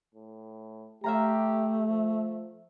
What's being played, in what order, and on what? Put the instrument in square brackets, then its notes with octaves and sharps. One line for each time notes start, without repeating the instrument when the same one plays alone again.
[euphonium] A2
[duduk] A3 [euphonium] G4 [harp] E5 F5 A#5
[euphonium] F3